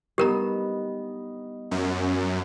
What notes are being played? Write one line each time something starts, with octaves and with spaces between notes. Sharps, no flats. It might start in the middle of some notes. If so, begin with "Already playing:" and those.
G3 B3 D#4 G4 A#4 A#5
F#2